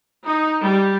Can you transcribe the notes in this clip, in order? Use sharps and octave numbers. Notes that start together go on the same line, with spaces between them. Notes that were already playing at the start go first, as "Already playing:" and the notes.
D#4
G3